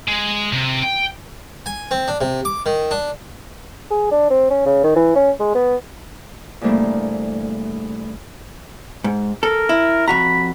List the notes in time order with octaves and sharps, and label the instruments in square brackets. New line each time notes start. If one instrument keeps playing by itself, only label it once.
[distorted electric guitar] G#3
C3
G5
[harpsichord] G#5
C4
D4
C3
D6
D#3
D4
[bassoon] G#4
D4
C4
C#4
C#3
D#3
E3
C#4
G#3
B3
[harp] E2 G2 C3 A3 A#3 D4
[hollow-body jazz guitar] G#2
[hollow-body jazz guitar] A4 [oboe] A#4
[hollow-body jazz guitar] E4
[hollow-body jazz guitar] F2 F#4 A#5 [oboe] B5